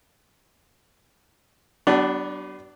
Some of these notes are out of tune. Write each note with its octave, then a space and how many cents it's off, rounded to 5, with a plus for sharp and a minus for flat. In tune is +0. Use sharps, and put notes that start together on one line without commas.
F#3 +45 B3 +5 D4 +0